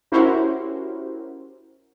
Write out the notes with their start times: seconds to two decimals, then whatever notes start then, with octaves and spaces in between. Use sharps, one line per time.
0.12 C#4 E4 F#4 G4 A#4 C5